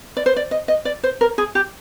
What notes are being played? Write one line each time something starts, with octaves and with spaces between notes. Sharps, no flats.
D5
C5
D5
D#5
D#5
D5
C5
A#4
G#4
G4